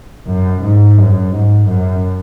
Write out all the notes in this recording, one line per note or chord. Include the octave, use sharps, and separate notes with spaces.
F#2
G#2
F#2
G#2
F#2